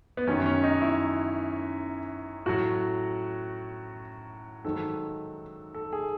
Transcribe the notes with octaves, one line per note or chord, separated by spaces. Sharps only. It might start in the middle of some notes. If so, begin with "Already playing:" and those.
B3
F#2 D#3 F#3 C#4
C#4
D#4
E4
A2 F#3 F#4
G#2 D#3 F#3 A4
A4
G#4